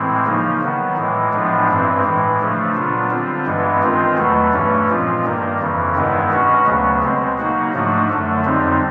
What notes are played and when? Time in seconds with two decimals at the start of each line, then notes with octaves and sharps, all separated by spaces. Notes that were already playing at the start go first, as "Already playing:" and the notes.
Already playing: A2 E3 G#3 C4
0.26 C#3 F3 A#3 D#4
0.61 D#3 F#3 B3
0.97 A2 E3 G#3
1.32 A2 F3 G#3 B3 D4
1.68 G2 E3 G#3 C4
2.04 A2 E3 G#3
2.39 C#3 F3 A3 D4
2.75 A#2 F#3 B3 D4 F4
3.10 D3 G3 C4 F4
3.46 G2 E3 G#3 B3
3.82 D#3 G#3 C4 F4
4.17 E2 B2 F#3 A3
4.53 G2 E3 A3 C#4
4.89 A#2 F3 G#3 C4 F4
5.24 G2 D#3 G3 A#3
5.60 F2 C#3 E3
5.95 G2 D#3 G#3 B3 E4
6.31 B2 G#3 C#4 F#4
6.66 D2 C#3 F#3 B3
7.02 B2 G#3 C4
7.38 C#3 F#3 A#3 D#4 F#4
7.73 G#2 F3 A3 D4 F#4
8.09 F#2 D3 F#3 A3
8.45 F2 D3 G3 C4 D#4